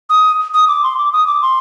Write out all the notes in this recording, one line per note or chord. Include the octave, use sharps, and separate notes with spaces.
D#6
D#6
D6
C6
D6
D#6
D6
C6